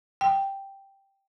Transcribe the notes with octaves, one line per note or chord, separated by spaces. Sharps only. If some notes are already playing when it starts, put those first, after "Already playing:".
G5